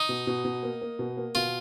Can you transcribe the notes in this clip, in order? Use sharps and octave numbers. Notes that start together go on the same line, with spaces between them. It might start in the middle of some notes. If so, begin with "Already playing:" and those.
Already playing: D#4
B2
B2
B2
A#3
A#3
B2
A#3
B2 F4